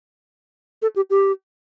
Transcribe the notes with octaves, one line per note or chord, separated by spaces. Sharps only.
A4
G4
G4